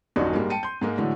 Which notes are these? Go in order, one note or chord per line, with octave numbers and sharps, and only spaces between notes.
D#1 A#1 F#2 A#2 D#4 F#4
G#2 G3 G#3 A#3
G5 A5 C#7 D#7
C6 G6
G#2 G#3 A#3
A2 D3 E3 F#3 G#3